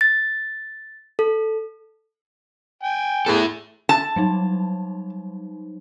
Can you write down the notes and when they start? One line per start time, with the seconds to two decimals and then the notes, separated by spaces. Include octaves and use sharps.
0.01 A6
1.19 A4
2.83 G5 G#5
3.26 E2 E4 A4
3.89 A5
4.16 F#3 G3 D#4